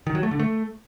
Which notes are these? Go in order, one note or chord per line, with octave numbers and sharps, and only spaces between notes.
D#3
F#3
A3
D3
A3